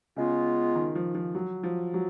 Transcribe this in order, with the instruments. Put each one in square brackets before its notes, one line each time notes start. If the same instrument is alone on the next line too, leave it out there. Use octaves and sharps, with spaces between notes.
[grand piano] C#3 [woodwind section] G#3 B3 F4
[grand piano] D#3
F3
F3
F#3
F3
F#3